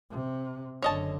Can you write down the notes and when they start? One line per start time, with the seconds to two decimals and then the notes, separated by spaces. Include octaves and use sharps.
0.11 C3
0.82 F#1 D3 C#5 D#5 A5